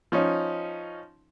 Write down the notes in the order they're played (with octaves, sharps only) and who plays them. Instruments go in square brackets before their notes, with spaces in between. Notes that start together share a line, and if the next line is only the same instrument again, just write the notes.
[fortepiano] F3 C#4 D#4